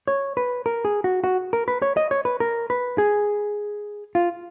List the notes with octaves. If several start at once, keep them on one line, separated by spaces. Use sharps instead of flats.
C#5
B4
A#4
G#4
F#4
F#4
A#4
B4
C#5
D#5
C#5
B4
A#4
B4
G#4
F4